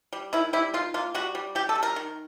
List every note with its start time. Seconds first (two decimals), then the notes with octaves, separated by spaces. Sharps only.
0.13 G3
0.33 D#3 E4
0.53 G3 E4
0.74 D#3 F4
0.94 A#3 F4
1.14 G3 F#4
1.35 G3
1.55 G3 G4
1.69 A4
1.75 G3
1.83 A#4
1.96 D#3